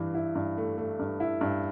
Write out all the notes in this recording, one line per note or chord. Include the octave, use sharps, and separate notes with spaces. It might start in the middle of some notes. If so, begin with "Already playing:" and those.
Already playing: G2 E3
E4
G2
A3
A3
G2
E4
G2